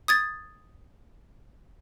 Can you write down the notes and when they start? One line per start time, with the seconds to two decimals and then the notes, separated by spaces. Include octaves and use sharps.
0.08 D#6 G#6 A6